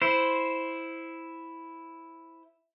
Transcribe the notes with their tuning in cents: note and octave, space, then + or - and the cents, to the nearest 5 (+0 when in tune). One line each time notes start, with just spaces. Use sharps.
E4 +0 C5 +0